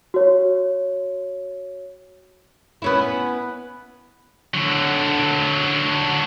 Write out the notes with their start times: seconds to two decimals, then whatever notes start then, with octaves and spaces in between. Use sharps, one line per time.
0.14 F#4 C#5
2.82 B3 C#4 E4
4.54 D3 F#3